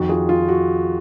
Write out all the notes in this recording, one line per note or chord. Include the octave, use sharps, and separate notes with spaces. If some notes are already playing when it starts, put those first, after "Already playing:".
Already playing: F2 D#3 F#4
F4 G#4
F4
F#4